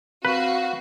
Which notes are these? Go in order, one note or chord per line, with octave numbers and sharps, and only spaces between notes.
C4 F#4 B4 F5